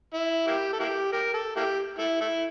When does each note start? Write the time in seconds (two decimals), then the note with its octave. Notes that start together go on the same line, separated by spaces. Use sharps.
0.14 E4
0.47 A#3 E4 G4
0.73 A4
0.80 A#3 E4 G4
1.13 G4 A#4
1.34 A4
1.56 A#3 E4 G4
1.99 A3 E4
2.21 A3 E4